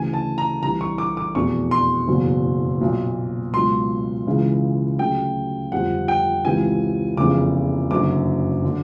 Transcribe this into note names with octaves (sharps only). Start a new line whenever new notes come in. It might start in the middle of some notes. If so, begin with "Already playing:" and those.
Already playing: D2 C#3 E3 G#5
A5
A#5
C2 C3 E3 A#5
C#6
D6
D6
F1 E2 B2 C#6
C6
F#1 E2 B2 F#3
B1 A#2 F#3
C#2 B2 F#3 C6
C#2 C#3 E3
D2 C#3 F#3 G5
G1 F2 C3 F3 F#5
G5
C#2 C3 E3 G#5
F1 E2 C#3 F3 D6
F#1 F#2 D3 F#3 D6
D3 F#3